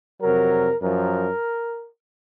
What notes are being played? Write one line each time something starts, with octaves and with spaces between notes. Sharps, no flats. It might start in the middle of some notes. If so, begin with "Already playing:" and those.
F2 C3 F#3 A#4
F#2 F3 A#4